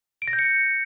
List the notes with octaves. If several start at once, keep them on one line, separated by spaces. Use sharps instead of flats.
D7
A#6
G6
C#7